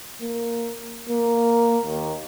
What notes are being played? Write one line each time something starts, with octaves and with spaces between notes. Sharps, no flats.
A#3
A#3
D#2